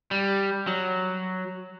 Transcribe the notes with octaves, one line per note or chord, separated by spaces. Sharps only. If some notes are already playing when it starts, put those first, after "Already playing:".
G3
F#3